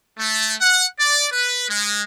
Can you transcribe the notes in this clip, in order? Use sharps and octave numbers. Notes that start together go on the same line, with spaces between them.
A3
F#5
D5
B4
G#3